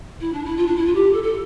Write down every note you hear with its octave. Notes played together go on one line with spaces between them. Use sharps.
E4
D4
E4
F4
D4
E4
F4
G4
A4
A4